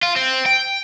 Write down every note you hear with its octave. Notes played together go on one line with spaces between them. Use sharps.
F4
C4
G5